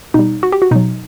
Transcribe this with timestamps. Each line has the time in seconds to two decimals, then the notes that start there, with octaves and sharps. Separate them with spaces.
0.14 B2 G3 D#4
0.43 F#4
0.52 G4
0.62 F#4
0.71 B2 F#3 D#4